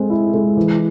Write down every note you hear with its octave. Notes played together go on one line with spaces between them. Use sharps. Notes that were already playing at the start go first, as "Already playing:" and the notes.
Already playing: G#3 C4
E4
G#3
E3